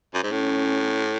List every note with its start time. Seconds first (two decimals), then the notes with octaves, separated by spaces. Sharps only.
0.14 F#2
0.23 G#2
0.32 A2 C#4